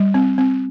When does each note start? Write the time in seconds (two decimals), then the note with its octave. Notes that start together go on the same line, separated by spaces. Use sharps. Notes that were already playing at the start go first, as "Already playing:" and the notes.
Already playing: G3
0.14 C4
0.38 C4